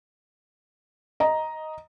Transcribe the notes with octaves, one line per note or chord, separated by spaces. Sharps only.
D#5 A#5